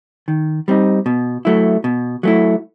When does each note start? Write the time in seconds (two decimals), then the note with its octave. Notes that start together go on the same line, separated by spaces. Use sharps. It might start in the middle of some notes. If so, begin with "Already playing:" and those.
0.28 D#3
0.68 G3 C4 D#4
1.06 B2
1.45 F#3 A3 E4
1.84 B2
2.23 F#3 A3 E4